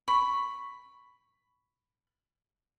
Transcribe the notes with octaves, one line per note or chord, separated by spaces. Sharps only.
B5 C#6